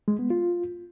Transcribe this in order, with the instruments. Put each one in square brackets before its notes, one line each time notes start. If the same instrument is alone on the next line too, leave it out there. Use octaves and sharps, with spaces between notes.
[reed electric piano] G#3
B3
F4